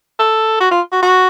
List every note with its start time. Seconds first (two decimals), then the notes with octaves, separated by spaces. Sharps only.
0.19 A4
0.60 F#4
0.71 F4
0.92 F#4
1.03 F#4